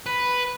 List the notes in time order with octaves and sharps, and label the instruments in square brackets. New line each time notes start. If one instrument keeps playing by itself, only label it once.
[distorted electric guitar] B4